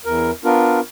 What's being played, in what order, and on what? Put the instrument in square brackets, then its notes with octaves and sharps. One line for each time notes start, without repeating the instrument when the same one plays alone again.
[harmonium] E2 A#4
B3 D4 F4 A#4